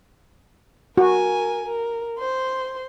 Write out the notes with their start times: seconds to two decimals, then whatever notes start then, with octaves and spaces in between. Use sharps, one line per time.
0.98 F#4 A#4 G#5
1.66 A#4
2.19 C5 C6